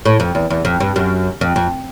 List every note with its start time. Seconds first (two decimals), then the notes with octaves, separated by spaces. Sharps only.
0.05 A2
0.20 F2
0.35 E2
0.50 E2
0.65 F2
0.80 G2
0.96 F#2
1.41 F2
1.56 F2